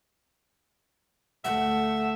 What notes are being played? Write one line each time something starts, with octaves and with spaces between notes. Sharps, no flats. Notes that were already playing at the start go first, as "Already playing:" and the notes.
D2 A3 E5 F#5